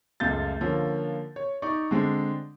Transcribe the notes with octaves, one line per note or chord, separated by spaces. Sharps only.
C#2 F#2 A3 F4 G6 A6
D3 F3 A#3 C#4
C#5
D#4 D5 C#6
D3 G#3 C4 D4